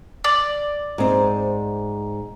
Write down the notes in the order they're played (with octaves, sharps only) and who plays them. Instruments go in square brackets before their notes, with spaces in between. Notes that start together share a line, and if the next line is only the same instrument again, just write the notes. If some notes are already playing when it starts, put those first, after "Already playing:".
[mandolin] D5
[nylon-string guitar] G#2 C4